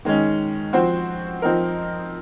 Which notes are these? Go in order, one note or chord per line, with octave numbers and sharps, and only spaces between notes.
D#3 G#3 C#4
F3 C4 F#4 C5
F3 C4 D#4 A#4